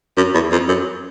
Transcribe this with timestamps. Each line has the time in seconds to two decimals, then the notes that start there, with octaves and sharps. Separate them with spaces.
0.17 F#2
0.34 E2
0.52 F2
0.68 F#2